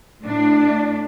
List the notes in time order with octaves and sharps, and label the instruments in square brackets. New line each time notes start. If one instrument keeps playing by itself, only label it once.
[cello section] A2 D4